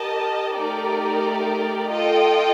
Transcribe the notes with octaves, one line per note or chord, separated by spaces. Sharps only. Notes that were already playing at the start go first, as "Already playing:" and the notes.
Already playing: G4 A#4 D#5 A5
A3 D#4 G4 A#4 D5
F4 A4 D#5 G5